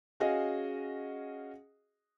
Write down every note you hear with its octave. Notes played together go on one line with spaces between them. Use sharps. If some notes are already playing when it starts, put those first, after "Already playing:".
C#4 F#4 G#4 D#5 F5 G#5